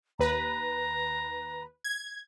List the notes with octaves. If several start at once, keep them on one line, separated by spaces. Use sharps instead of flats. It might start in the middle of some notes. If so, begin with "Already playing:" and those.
D#2 B4 A#5
G#6